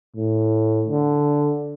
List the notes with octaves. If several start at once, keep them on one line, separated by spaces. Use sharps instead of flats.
A2
D3